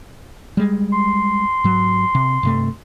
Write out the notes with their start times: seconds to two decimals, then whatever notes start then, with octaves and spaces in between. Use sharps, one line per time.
0.57 G3 G#3
0.92 C6
1.64 G#2 F#3
2.15 C3
2.43 G2 C3 A3